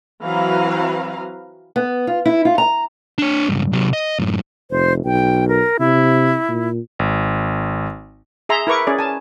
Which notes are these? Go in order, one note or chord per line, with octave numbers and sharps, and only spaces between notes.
E3 F#3 C4 B4 F5 A#5
B3
F4
E4
F4
A#5
D4 C#5
C#2 G2
C3 F#3
D#5
F#2 A2
F1 C5
B1 G5
A#4
C3 E4
A#2
G#1
G#4 E5 A#5 C6
E4 A#4 B4 C#6 D6
C#4 G#4 D5
G#5 A5